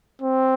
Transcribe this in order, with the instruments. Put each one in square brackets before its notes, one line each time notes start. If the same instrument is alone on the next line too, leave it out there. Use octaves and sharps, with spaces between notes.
[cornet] C4